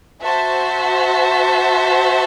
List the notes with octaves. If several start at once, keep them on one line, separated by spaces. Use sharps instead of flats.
F#4 C5 E5 A5